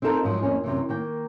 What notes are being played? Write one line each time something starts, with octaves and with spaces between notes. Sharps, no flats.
C4 D#4 F4 A4 A#4
E2 G#2 F3 F#3
F2 F3 A#3 C#4
F#2 C3 E3
D#3 A#3 G5